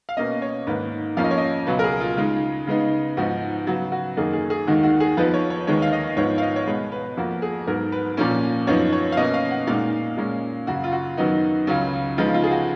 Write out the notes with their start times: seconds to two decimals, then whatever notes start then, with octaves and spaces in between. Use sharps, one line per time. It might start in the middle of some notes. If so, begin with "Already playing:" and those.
0.09 F5
0.17 B2 A#3 C#4 D#5
0.42 C#5
0.67 G#2 D#3 A#3 B4
1.17 F2 F3 A#3 C#4 F5
1.24 D#5
1.31 C#5
1.38 D#5
1.67 C#2 B2 F#3 B4
1.79 A#4
1.84 G#4
2.00 F4
2.17 C#3 G#3 D#4
2.67 C#3 G#3 B3 D#4
3.17 G#2 F3 B3 D#4 F#4
3.67 C#3 F#3 B3 F#4
3.92 F#4
4.17 F#2 D#3 A#3 D#4 G#4
4.33 G#4
4.50 G#4
4.67 D#2 D#3 G#3 D#4 F#4
4.83 F#4
5.00 G#4
5.17 F2 F3 B3 D#4 B4
5.34 C#5
5.50 C#5
5.67 D#2 D#3 G#3 B3 D#4 C#5
5.82 F5
5.92 D#5
6.17 G#2 F3 B3 C#5
6.38 F5
6.42 D#5
6.56 C#5
6.67 B2 G#3 B3 B4
6.92 B4
7.17 F2 F3 A#3 F#4
7.42 G#4
7.67 G#2 F#3 B3 A#4
7.92 B4
8.17 A#2 F3 A#3 C#4
8.67 F#2 F3 B3 D#4 C#5
8.93 C#5
9.12 F5
9.17 B2 A#3 C#4 D#5
9.34 F5
9.51 F#5
9.67 A#2 G#3 D#4 F5
10.17 A#2 G#3 C#4
10.67 F#2 C#3 F#3 F#4
10.84 F4
10.92 F#4
11.17 F#2 D#3 F#3 B3 D#4
11.67 C#2 C#3 F#3 C#4
12.18 C#3 F3 G#3 B3 D#4 F4
12.34 F4
12.43 G#4
12.51 F#4